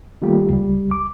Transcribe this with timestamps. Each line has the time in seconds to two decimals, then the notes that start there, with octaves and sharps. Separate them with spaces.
0.22 D#3 G3 A3 A#3 F4 G4
0.50 C#2 G3
0.91 D6